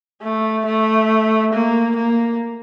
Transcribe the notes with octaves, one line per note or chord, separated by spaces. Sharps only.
A3
A3
A#3
A#3